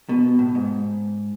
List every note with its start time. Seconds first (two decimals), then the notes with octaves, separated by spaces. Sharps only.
0.09 B2
0.39 A2
0.55 G#2